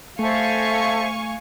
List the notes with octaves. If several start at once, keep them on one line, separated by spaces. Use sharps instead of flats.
A3 A4 C5 E5 F5 G#5 C#6